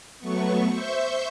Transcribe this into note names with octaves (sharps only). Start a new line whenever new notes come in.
F#3 A3 B3 C#6
C5 E5 C#6 G6